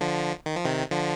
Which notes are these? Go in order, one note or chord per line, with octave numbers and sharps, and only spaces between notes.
D3 F3
D#3
F3
C3 D#3
D3 F3